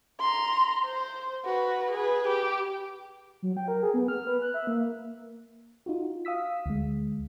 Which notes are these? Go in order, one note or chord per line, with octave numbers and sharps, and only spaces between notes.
A#5 C6
C5
F#4 B4
G#4 B4
G4
F#3
G5
A#4
G#4
B3
F6
B4
F#6
E5
A#3
D#4 F4 F#4
F5 D#6 E6 B6
D2 G#3